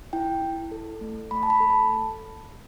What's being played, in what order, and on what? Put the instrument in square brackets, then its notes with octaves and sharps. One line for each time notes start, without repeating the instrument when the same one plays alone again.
[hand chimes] E4 G5
E4
A4
A3
A3 B5
A5
B5
A4
A5